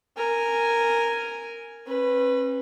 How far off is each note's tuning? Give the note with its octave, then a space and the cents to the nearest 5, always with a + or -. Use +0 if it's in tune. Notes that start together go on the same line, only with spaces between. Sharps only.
A#4 -5 G#5 +0
C#4 -45 B4 +0